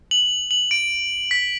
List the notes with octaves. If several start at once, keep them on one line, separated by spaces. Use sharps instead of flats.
F#7
F#7
D7
B6